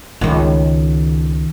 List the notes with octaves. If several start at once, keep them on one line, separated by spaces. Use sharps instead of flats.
C#2 D#3